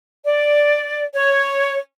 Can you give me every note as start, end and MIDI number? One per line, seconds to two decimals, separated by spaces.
0.25 1.04 74
1.14 1.78 73